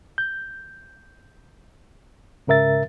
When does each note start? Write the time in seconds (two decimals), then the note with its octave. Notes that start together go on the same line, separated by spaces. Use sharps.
0.18 G6
2.47 G#2 C#3 A#4 E5 A6